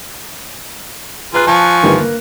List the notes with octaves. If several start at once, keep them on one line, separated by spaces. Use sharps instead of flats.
F4 G#4 B4 A#5 F#6
F3 G#5 A5 C#6
G1 D#3 G3
A#3